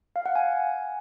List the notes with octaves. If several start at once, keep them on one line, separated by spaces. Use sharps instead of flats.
F5
F#5
G#5